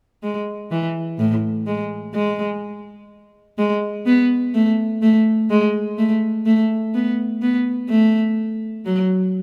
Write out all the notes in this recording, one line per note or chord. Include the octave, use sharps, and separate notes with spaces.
G#3
E3
A2
G#3
G#3
G#3
B3
A3
A3
G#3
A3
A3
B3
B3
A3
F#3